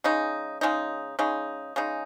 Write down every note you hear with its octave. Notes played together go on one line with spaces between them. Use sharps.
C#3 G#3 D#4
C#3 G#3 D#4
C#3 G#3 D#4
C#3 G#3 D#4